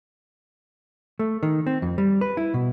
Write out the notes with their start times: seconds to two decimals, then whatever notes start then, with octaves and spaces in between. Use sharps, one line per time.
1.19 A3
1.43 D#3
1.67 C4
1.82 F2
1.98 G3
2.21 B4
2.37 E4
2.54 B2